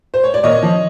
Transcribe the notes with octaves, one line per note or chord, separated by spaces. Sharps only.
C5
C#5
D5
A#2 C#5 D#5
F3